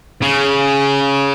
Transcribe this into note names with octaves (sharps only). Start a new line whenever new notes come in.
C#3